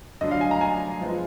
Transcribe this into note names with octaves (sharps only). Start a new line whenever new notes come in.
D3 F#3 D4 D#5
F5
G#5
A#5
G#5
F3 G#3 B3